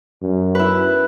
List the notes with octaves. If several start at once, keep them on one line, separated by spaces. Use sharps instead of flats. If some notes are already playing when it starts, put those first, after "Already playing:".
F#2
E4 B4